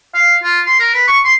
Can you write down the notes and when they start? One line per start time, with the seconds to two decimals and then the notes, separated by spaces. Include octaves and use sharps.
0.14 F5
0.43 F4
0.67 C6
0.80 A#4
0.94 B4
1.08 C#6
1.24 C6